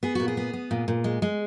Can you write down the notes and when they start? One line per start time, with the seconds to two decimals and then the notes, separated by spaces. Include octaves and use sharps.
0.03 B3 G#4
0.15 A#2 F#4
0.28 G#4
0.37 B3
0.54 B3
0.71 A#2
0.88 A#2
1.04 G#3
1.22 G#3